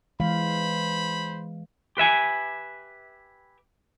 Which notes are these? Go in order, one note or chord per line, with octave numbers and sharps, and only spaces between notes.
E3 G#3 C5 F5 B5
G4 B4 E5 G#5